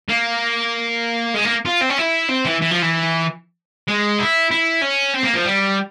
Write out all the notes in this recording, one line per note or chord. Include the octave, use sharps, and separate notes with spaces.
A#3
G#3
A#3
F4
C4
C#4
E4
C4
E3
E3
F3
E3
G#3
E4
E4
C#4
C4
A#3
F3
G3